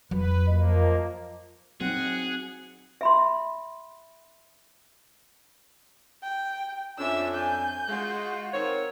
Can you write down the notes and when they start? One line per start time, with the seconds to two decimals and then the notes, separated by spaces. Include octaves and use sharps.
0.11 F2 F#3 B4
0.48 F3 A#3 D#5
1.81 F#3 C4 D#4 G#4 F#5
3.01 E5 B5 C6
6.23 G5
6.98 F2 C#4 D4 E5 E6
7.34 G#5 G6
7.88 G#3 F4 F#4
8.53 D#3 C4 C#5